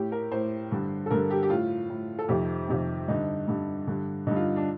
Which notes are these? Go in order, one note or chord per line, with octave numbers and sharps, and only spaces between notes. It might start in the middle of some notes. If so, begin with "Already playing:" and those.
Already playing: A2 G4
A#4
A2 C5
G2 D3
A4
G2 D3 A#4
G4
G4
A2 F4
A2
A4
F2 C3 D#3 G4
F2 C3 D#3
G2 D3 D#4
G2 D3
G2 D3
G2 D3 D#4
F4
D4